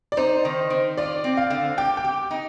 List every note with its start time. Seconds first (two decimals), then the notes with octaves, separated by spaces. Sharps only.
0.12 D5
0.17 D#4 C5
0.45 D#3
0.70 D#3
0.97 F4 D5
1.24 C4
1.37 F5
1.50 D3
1.78 G4 G5
1.97 G5
2.04 G4
2.31 D#4